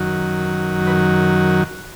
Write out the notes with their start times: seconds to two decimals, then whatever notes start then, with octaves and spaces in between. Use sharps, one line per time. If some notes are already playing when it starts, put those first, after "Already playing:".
Already playing: F#2 D#3 F#3
0.87 B4